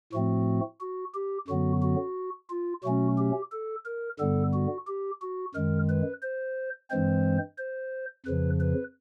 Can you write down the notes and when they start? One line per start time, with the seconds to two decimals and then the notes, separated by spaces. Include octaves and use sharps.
0.13 A2 F3 A3 C4 F#4
0.80 F#4
1.14 G4
1.48 F#2 D3 F#3 B3 F#4
1.82 F#4
2.50 F4
2.84 B2 F#3 A3 C#4 F#4
3.18 G4
3.52 A4
3.86 A#4
4.19 G2 D3 G3 B3 A4
4.53 F#4
4.87 G4
5.21 F#4
5.55 F#2 D#3 G#3 A#4
5.89 B4
6.23 C5
6.91 G2 E3 G#3 C4 C5
7.58 C5
8.26 F2 C#3 F3 B4
8.60 B4